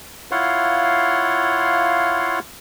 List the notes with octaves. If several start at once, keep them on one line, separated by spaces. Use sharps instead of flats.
E4 F4 C#5 F5 F#5 C6